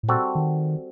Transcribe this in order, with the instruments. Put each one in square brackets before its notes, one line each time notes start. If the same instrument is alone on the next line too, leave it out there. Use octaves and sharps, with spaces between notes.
[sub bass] A2
[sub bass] A#2 [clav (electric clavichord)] G3 C4 F#4 A4
[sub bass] D#3